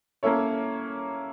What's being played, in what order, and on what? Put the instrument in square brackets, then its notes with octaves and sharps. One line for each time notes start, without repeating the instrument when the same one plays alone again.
[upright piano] A#3 C#4 E4 A4 C#5